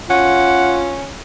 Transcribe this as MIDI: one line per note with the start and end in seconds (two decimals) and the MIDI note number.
0.10 1.13 61
0.10 1.02 65
0.10 0.79 78